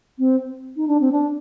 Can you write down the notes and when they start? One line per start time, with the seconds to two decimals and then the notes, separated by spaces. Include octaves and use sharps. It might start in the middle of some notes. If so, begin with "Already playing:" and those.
0.19 C4
0.76 D#4
0.88 D4
1.01 C4
1.12 D4